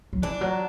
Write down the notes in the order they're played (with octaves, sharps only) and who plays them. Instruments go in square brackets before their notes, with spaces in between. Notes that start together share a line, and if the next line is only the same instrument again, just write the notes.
[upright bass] F#3
[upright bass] E3 [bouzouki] D4
[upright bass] F#3